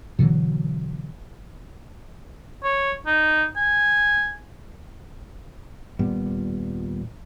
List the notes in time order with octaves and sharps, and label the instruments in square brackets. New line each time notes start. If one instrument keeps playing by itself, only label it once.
[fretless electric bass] B2 D3 E3 F#3
[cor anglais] C#5
D#4
G#5
[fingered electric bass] D#1 A#2 G3 B3